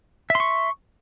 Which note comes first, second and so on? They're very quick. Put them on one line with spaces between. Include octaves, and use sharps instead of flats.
E5 C6 C#6